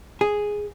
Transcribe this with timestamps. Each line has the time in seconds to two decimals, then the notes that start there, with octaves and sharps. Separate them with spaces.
0.21 G#4